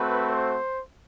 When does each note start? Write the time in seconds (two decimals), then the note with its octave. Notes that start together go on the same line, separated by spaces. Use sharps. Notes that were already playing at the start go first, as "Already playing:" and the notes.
Already playing: A3 C4 F#4 B4
0.31 C5